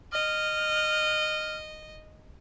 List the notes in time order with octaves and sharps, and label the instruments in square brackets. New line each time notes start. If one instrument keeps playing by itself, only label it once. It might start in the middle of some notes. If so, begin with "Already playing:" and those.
[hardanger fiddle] D#5 [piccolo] F6